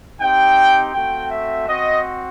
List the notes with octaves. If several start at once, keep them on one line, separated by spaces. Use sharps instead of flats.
C4 D#4 G4 G5
A3 C4 F#4 G5
E5
C4 F#4 D#5